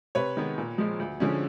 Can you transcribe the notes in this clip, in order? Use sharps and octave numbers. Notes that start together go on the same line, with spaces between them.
C3 B4 C#5
D#3 G#3 B3
A#2
F3 G#3
D2
D3 F3 G#3 C#4